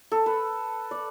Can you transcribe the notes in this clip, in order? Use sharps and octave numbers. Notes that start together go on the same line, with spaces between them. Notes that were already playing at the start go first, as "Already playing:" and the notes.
A4
B4
D5